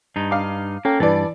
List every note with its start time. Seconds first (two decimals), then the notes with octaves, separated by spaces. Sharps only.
0.16 G2 D#4
0.31 F5 D6
0.85 A#3 C#4 A4 G5
1.00 G2 E3 B4 D5 A5 A6